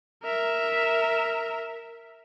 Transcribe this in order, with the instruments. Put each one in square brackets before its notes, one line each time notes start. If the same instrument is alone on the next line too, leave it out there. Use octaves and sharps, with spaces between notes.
[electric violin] A#4 E5